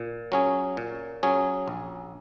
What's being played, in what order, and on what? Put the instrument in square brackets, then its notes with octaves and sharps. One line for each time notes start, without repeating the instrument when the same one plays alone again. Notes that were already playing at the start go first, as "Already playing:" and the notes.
Already playing: [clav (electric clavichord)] A#2
F#3 C#4 G#4
A#2
F#3 C#4 G#4
A#1